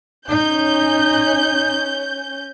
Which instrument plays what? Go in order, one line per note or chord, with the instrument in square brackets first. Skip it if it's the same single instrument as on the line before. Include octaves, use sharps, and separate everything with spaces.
[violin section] C#4 G6 [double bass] D#4